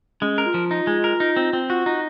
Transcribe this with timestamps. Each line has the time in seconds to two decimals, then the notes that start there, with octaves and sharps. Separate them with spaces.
0.21 G#3 C#4
0.38 A#4
0.46 F4
0.54 F3
0.71 D#4
0.87 G#3
1.04 A#4
1.20 D#4
1.37 C4
1.53 C4
1.69 F4 F#4
1.86 D#4